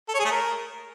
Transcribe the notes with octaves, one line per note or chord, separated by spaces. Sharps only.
A4
C#5
G#4
A3
A#4